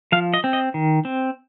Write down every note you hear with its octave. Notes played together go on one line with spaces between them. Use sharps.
F3 F5
D#5
C4
D#5
D#3
C4